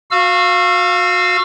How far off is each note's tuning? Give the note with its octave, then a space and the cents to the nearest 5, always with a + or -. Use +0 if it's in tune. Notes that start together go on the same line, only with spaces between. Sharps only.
F#4 -25 F5 +0 E6 +30